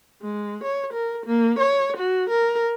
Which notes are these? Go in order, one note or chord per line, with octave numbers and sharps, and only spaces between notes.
G#3
C#5
A#4
A#3
C#5
F#4
A#4